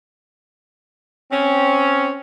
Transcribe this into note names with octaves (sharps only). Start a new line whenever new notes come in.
C4 C#4